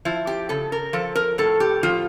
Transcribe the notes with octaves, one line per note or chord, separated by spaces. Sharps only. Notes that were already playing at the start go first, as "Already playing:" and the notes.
F3 E4
G4
C#3 A4
A#4
F3 A4
A#4
A2 A4
G4
F3 F4